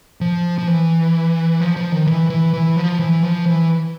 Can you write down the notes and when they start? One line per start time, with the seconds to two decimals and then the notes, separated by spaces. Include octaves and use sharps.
0.21 F3
0.58 F3
0.68 E3
1.60 F3
1.77 F3
1.92 D#3
2.07 E3
2.30 E3
2.53 E3
2.76 F3
3.00 E3
3.23 F3
3.46 E3